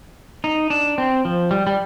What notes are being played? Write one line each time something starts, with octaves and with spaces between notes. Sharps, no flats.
D#4
D4
C4
F3
G3
G3